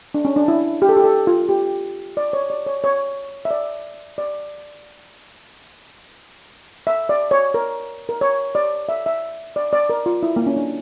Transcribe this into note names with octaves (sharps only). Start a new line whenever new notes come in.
D4
C#4
D4
E4
G4
A4
G4
A4
F4
G4
D5
C#5
D5
C#5
C#5
E5
D5
D5
E5
D5
C#5
A#4
A#4
C#5
D5
E5
E5
D5
D5
A#4
F4
E4
A#3
C#4
D4